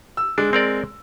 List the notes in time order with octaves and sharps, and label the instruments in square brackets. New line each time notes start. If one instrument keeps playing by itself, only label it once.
[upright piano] E6
[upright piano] G#3 [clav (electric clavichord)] D4
[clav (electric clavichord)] C4 A#4 D5